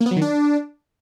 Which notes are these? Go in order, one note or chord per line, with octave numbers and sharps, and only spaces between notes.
A#3
B3
F#3
D#3
D4